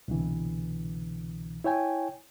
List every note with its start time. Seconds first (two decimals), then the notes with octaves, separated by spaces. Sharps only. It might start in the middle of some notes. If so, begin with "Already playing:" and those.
0.08 C2 B2 D3 E3
1.64 E4 C#5 G5 G#5